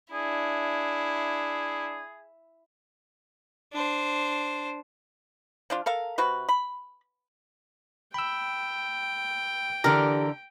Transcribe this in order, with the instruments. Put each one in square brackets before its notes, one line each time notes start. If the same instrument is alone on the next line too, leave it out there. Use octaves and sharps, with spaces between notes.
[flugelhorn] D4 [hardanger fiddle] E4 [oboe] G#4
[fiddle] D4 C5
[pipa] F3 D4 F4
A4 A#4 F5
C3 F#4 B4
B5
[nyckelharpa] G5 [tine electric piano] B5 E6
[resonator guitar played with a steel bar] D3 E3 [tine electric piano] G4 [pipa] A#4